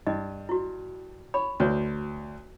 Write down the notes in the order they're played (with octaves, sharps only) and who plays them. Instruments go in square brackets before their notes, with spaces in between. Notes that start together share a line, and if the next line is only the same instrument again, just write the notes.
[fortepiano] G2 [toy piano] D#5
[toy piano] E4 F#4
[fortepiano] C#5 [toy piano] B5
[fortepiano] D2 [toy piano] F#4 B4 C#5